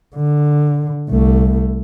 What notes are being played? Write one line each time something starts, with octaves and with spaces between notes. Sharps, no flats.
D3
C2 A3